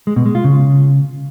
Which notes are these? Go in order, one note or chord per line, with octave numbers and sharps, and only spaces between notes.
G#3
B2
G#3
F4
C#3